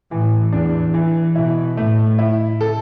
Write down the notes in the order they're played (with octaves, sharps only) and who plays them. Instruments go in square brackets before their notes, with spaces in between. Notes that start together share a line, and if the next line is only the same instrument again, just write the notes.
[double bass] A2 [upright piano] E3
[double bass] E2 [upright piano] D4
[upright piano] E3
[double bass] B2 [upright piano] E4
[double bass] A2 [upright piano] A3
[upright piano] E4
A4